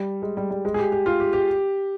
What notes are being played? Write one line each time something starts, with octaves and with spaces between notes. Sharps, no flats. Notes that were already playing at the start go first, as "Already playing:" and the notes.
Already playing: G3
G#3
G3
G3
G#3
G#4
G4
G4
F4
G4
G4